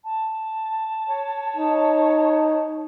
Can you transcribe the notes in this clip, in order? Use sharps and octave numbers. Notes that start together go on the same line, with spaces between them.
A5
C#5
D#4